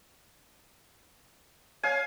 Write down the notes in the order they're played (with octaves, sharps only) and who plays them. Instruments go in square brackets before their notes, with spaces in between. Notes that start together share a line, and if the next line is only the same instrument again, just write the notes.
[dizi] C#5 [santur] F5 G#5